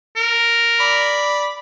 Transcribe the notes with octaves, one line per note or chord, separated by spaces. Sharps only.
A#4
D5 B5